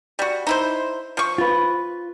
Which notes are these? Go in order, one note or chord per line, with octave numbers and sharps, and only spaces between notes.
G3 F#4
D#4 E4 C5
F3 C#6
F4 B4